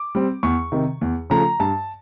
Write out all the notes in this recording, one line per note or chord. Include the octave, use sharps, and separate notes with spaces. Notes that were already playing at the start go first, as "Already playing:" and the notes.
Already playing: D6
G3 C4
E2 C#6
C3 D#3
E2
C#3 F3 A3 A#5
G2 A5